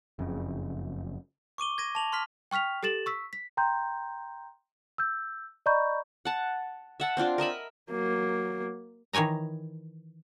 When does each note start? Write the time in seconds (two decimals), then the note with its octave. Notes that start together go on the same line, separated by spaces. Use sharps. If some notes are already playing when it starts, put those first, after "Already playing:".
0.19 F#1 F2 C#3
1.58 C#6 D6 D#7 G7
1.78 G#6 A#6 D#7
1.95 A5 F7 F#7
2.12 C6 F6 B6
2.51 G5 C#6 F6 B6 F7
2.83 G4 A4 A6 E7 F#7
3.06 C#6 E6 B6
3.33 B6
3.57 G5 A#5 C6 G6
4.98 E6 G6
5.66 D5 D#5 A#5 B5 C#6 G6
6.25 F#5 A5
7.00 E5 F#5 A5
7.17 C4 D4 F4 D5
7.38 A#4 D#5 E5 B5
7.91 F#3 A#3
9.13 D#3 E3 C#5 G#5 A#5